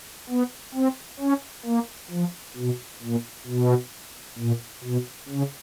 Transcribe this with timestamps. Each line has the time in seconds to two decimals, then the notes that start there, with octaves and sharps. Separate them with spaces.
0.29 B3
0.74 C4
1.20 C#4
1.65 A#3
2.11 F3
2.57 B2
3.02 A#2
3.47 B2
4.38 A#2
4.84 B2
5.29 C#3